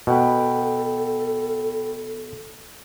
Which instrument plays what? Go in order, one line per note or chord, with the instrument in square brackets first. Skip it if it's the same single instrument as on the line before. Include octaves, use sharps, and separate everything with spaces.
[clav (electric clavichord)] B2 [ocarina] A4 [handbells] F#5 G5 B5